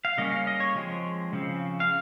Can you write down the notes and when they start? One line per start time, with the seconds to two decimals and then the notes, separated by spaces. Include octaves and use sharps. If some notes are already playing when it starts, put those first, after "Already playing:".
0.05 F5
0.17 C#3 G3 A#3 C#4 D#5
0.32 F5
0.47 D#5
0.60 C#5
0.76 F3 G#3 C4
1.33 C#3 F3 C4
1.80 F5